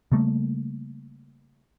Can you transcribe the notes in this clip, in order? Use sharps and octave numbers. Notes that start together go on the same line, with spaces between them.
C#3 G3 A3 A#3